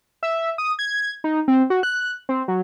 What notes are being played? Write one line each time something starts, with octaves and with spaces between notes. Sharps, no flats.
E5
D#6
G#6
D#4
C4
F#4
F#6
C4
F#3